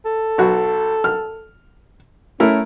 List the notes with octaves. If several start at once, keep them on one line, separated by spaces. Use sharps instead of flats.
A4
B1 F#4
F6
A3 C#4 E4 A#4